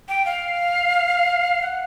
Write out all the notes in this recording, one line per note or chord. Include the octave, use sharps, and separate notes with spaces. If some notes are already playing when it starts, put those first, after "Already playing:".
G5
F5
F#5